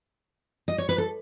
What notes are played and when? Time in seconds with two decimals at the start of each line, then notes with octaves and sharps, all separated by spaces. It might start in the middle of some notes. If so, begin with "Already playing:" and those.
0.68 D#5
0.78 C#5
0.89 B4
0.98 A4